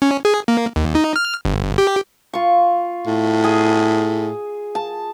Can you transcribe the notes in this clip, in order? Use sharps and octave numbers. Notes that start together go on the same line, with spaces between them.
C#4
G#4
A#3
D#2
D#4
F6
G1
G4
F4 C#6
A2
G#4
A5